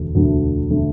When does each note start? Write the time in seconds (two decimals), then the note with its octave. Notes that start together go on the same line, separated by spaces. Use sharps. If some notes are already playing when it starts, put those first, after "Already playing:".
Already playing: E1 D2 D3 A3
0.14 E1 D2 D3 A3
0.71 D3 A3